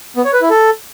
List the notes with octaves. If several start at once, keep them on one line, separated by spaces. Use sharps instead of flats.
B3
C#5
B4
E4
A4